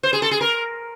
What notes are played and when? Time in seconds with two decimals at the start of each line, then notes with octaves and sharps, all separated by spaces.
0.03 C5
0.13 G#4
0.22 A4
0.31 G#4
0.41 A#4